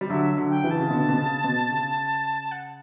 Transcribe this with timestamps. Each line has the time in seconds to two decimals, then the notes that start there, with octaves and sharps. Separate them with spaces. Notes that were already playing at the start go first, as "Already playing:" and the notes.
0.01 G3
0.10 D3 F#3 E5
0.37 D3 F#3
0.50 G5
0.64 C#3 E3
0.71 A5
0.79 C#3
0.91 B2 D3
1.09 B2
1.18 C#3
1.44 B2
1.71 C#3
2.52 F#5